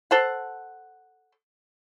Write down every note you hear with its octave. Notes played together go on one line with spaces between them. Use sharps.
A4 C5 F#5